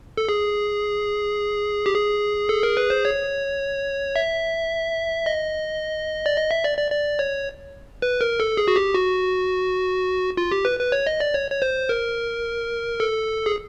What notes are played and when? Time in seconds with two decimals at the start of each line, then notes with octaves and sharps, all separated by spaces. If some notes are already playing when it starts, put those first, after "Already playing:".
0.17 A4
0.29 G#4
1.86 G4
1.94 G#4
2.49 A4
2.63 A#4
2.77 B4
2.90 C5
3.05 C#5
4.16 E5
5.26 D#5
6.26 D5
6.36 D#5
6.51 E5
6.64 D5
6.78 D5
6.92 D5
7.19 C#5
8.02 B4
8.21 A#4
8.40 A4
8.57 G#4
8.68 F#4
8.76 G4
8.94 F#4
10.37 F4
10.51 G4
10.65 B4
10.79 B4
10.92 C#5
11.07 D#5
11.20 D5
11.34 C#5
11.51 C#5
11.62 C5
11.89 A#4
13.00 A4
13.46 G#4